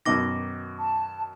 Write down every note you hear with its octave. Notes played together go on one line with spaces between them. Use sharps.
F#2 B2 D#3 D6 A#6
A5